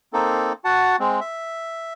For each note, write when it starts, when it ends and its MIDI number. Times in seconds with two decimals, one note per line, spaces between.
0.13 0.53 58
0.13 0.53 60
0.13 0.53 63
0.13 0.53 69
0.65 0.96 66
0.65 0.96 78
0.65 0.96 81
0.99 1.20 56
0.99 1.20 60
1.21 1.93 76